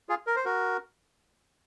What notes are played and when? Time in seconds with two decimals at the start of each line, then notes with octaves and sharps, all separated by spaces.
0.09 F4 G#4
0.27 A#4
0.36 C5
0.45 F#4 A#4